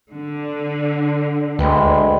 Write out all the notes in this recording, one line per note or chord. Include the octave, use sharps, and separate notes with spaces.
D3
D2 G#3 B4 G5 B5